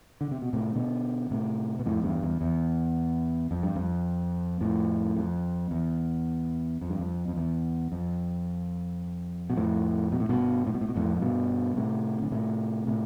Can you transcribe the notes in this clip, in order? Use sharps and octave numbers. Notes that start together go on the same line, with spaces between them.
D3
C3
B2
A2 C3
B2 D3
A2 C3
B2
F2 A2
E2 G2
E2
E2
F2
G2
F2
F2 A2
F2
E2
F2
G2
F2
F2
E2
F2
B2
F2 A2
B2
A2
G2 B2
A2
B2
A2
B2
F2 A2
A2
G2 B2
A2 C3
D3
A2 C3
A2 C3